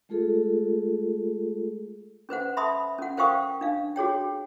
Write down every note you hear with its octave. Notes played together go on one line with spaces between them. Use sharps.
G#3 A3 F4 G#4 A4
C#4 B4 C5 F#5
E5 A5 B5 C6 D#6
C#4 F#5
A#4 C5 F5 G5 C#6 D#6
D4 F5
F#4 G#4 C#5 G5